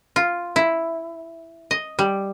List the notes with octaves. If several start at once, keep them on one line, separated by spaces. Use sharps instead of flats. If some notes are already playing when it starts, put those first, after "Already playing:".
F4
E4
D#5
G3